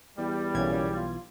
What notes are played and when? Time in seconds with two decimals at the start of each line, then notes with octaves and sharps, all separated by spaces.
0.18 E2 G3
0.55 B1 A#2 C#3 E3 G#6
0.94 F4